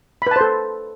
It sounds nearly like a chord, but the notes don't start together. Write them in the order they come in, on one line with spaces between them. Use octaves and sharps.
B5 B4 A5 C5 A4